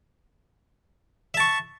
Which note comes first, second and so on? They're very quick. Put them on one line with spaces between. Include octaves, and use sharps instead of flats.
E5 A5 C#6